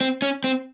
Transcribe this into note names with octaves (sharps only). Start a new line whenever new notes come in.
C4
C#4
C4